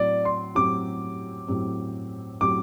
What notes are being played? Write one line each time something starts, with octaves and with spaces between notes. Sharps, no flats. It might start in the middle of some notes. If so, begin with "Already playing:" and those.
Already playing: A2 F#3 C4 D5
C6
A2 F#3 C4 G4 D6
A2 F#3 C4 G4
A2 F#3 C4 G4 D6